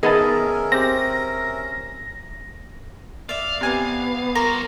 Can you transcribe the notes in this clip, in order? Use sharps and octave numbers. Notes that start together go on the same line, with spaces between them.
D#3 B3 C#4 G#4 A#4 D#5 E5 A5
C4 G4 A#6
D5 E5 F5
C3 B3 G#5
G3 F4 A#4 C6 C#6